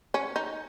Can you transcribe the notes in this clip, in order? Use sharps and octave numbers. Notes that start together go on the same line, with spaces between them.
C#4
D#4